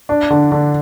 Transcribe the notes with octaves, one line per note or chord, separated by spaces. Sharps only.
D4
D3
D3